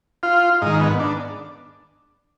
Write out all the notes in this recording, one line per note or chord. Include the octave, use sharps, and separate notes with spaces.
F4
G#2 D#3 D#4
B3
D4